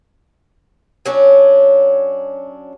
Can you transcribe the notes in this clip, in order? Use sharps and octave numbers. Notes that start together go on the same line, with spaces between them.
F#3 C#4 D4